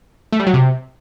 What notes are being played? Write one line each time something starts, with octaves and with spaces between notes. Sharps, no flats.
A3
G3
F#3
C3